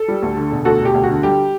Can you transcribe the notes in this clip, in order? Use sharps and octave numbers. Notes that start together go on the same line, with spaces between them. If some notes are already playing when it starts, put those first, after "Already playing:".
Already playing: A4
G3
D2
D3
E1
D2 F#4 A4
E1
G4
D2
F#4
D3
G3 G4